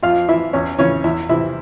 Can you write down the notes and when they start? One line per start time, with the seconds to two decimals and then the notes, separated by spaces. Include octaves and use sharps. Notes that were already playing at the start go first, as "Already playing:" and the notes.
0.03 F2 F4 F5
0.28 E3 E4 E5
0.53 E2 C#4 C#5
0.78 C#3 E3 C#4 C#5
1.04 E2 E4 E5
1.29 C3 E3 E4 E5